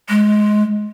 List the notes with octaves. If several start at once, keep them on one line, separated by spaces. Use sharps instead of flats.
G#3